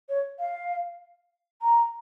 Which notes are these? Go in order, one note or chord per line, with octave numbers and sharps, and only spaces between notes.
C#5
F5
A#5